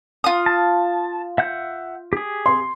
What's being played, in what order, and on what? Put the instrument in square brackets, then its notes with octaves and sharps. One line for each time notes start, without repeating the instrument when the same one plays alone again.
[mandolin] F4 D#6
[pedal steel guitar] A5
E5 F#5 G6
G4 G#4
[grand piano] C6